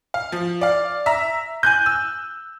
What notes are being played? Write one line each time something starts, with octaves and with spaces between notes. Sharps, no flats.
F5
F3
D5 F5
E5 A#5
G#5 F#6 G6
E6